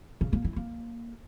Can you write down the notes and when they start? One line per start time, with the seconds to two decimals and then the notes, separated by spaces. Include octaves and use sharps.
0.21 C#3
0.33 A#3
0.45 E4
0.56 A#3